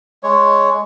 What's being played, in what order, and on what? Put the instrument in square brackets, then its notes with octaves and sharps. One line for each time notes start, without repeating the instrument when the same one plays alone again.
[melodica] G#3 C#5